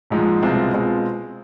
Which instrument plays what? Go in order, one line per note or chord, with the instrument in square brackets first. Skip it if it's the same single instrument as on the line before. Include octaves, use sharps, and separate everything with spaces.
[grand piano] A#1 G#2 F3 G#3
C2 B2 G#3 C4 F4
B2 G#3 C4 F4